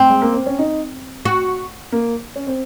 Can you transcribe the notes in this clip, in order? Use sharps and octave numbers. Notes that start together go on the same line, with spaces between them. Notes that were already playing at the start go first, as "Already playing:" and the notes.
Already playing: C4
G#3
A#3
C4
C#4
D#4
F#4
A#3
C#4
C4